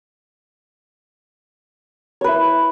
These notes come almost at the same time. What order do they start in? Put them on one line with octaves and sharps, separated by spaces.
C#5 B4 E4